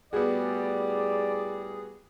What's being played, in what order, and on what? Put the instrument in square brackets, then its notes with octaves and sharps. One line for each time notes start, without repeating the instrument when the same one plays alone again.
[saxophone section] A2 G3 [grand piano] B3 F#4 [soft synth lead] G#4 [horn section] D5